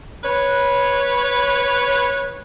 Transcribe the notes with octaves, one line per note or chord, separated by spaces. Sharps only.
B4 C#5